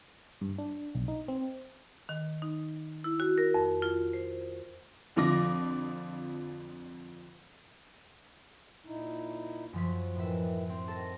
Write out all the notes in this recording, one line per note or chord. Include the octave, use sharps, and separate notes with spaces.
G2
D4
B1
D#4
C4
D#3
D#4
E4
F#4
A#4
F2
F4
C5
F2 D3 F3 D6 A#6
A#2 D#4 E4
F#2 F3 B6
A2 D#3 E3 E5
C4
D#3 A4 A#6